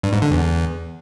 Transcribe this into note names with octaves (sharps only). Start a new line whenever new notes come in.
G2
G#2
D3
E2